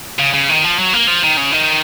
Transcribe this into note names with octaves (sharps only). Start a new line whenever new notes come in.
C#3
C#3
D#3
F3
F#3
A#3
F3
D#3
C#3
D#3